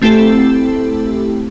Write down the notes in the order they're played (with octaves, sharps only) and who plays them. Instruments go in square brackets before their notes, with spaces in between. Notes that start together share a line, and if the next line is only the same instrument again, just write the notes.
[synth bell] A3 C4 E4 G4 A4